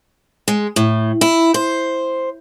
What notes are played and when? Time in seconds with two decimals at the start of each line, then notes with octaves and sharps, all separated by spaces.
0.48 G#3
0.76 A2
1.21 E4
1.54 C5